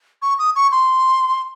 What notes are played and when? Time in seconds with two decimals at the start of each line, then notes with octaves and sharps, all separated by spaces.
0.22 C#6
0.39 D#6
0.56 C#6
0.72 C6